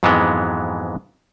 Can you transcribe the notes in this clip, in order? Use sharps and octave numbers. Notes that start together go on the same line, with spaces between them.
F2 G#2 E3 F#3 G#3 B3